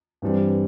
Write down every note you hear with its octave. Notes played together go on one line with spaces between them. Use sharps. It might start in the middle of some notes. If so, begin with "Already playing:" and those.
G2 E3 G3 C4